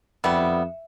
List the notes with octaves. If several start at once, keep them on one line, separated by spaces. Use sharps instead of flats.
F2 G3 B3 E5